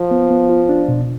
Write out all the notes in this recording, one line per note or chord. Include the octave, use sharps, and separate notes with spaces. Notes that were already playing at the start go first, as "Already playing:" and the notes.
Already playing: F3
B3
B3
F4
D4
B2